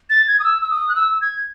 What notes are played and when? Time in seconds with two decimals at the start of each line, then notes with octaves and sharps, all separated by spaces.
0.10 A6
0.28 G#6
0.39 D#6
0.44 E6
0.62 E6
0.70 D#6
0.89 F#6
0.96 E6
1.21 G#6